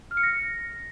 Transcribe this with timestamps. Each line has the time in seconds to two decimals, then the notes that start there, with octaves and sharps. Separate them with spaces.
0.11 F6
0.17 C#7
0.23 A#6